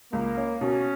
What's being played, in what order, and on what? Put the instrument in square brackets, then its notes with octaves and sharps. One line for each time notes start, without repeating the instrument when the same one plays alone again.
[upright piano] C#2 [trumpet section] A#3
[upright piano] C#4
[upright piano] B2 [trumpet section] C#4